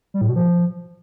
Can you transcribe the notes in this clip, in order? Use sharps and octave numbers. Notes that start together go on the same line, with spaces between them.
G3
A2
B2
F3